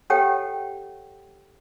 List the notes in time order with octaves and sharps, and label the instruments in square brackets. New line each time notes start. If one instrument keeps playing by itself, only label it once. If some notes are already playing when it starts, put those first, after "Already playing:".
[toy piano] G4 A4 C#5 F#5 G5